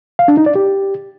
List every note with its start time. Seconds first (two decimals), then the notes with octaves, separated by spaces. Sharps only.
0.19 F5
0.28 D4
0.37 D#4
0.46 D5
0.55 G4